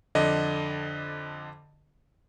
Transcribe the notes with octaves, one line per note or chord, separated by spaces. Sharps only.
F2 D3 D5 D#5